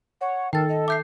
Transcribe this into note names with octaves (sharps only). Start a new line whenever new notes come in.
C#5 F#5
D#3 A4 A#4 G5 A6
D#5
E5 D6 G6 C7